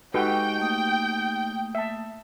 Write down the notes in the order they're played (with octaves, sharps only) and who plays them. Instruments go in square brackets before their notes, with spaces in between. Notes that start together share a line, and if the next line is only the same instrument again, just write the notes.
[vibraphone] G#3 [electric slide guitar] D#4 G4 [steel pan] F#4 A4 B4 [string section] G5
[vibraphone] A3 A#3 D#6
[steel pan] E5 A5